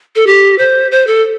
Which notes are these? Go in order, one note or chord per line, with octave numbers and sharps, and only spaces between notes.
A4
G4
C5
C5
A4